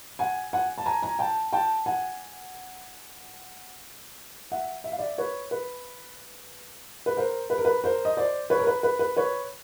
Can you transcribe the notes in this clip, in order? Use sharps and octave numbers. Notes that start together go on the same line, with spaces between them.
F#5 G#5
F#5 G#5
A5
G#5 A#5
G#5 A#5
G5 A5
G5 A5
F#5 G#5
E5 F#5
E5
F5
D5 E5
B4 C#5
B4
B4
A#4 C5
B4
A#4
B4
A#4 C5
D#5
C5 D5
B4 C#5
A#4
B4
B4
B4
B4 C#5